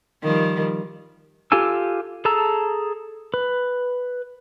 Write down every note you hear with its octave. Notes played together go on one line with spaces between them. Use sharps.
D#3 F3 G3
F4 G4 A4 G#5 E6
G#4 A4 A5 A#5 E6
B4